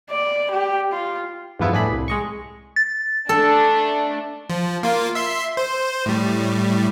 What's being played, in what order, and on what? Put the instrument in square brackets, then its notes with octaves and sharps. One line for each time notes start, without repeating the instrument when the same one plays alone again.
[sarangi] D5
G4
F4
[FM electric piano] E2 G2 F3 B3 E4
A2 D4 G#4 B5
C2
G#3 D#5 C#6
[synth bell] A6
[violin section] A3 D4 [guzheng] A4
[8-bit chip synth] F3
A#3 F4
E5 C6
C5
A2 G3